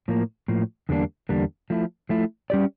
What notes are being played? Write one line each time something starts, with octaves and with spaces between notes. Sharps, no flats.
A2 F3 A#3
A2 F3 A#3
E2 D3 G3 A#3 D4
E2 D3 G3 A#3 D4
F3 A3 E4
F3 A3 E4
G3 C#4 G4 D5